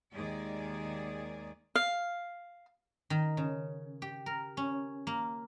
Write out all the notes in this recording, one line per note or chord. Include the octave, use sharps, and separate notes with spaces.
D#2 D#3 G#3 G#4 D5
F5
D#3
C#3
G4
A#4
C#4
A#3